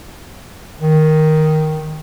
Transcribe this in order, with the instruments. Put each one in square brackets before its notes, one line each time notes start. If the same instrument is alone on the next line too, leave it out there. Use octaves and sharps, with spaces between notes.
[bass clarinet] D#3